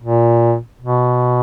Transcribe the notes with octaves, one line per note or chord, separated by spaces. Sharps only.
A#2
B2